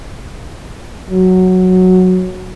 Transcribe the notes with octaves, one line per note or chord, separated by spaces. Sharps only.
F#3